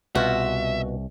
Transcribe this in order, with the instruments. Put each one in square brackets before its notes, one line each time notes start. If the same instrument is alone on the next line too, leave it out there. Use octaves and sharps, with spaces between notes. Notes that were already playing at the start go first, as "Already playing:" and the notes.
[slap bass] C2 [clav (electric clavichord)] B2 F4 [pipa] F#4 [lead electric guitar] E5